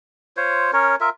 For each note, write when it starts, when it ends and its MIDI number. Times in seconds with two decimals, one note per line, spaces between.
0.37 0.71 65
0.37 0.71 72
0.37 0.71 73
0.73 0.96 61
0.73 0.96 70
0.73 0.96 73
1.01 1.09 65
1.01 1.09 70
1.01 1.09 76